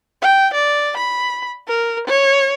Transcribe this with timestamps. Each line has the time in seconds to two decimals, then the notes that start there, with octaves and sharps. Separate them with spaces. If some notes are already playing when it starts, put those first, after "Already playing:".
0.22 G5
0.54 D5
0.97 B5
1.68 A#4
2.07 C#5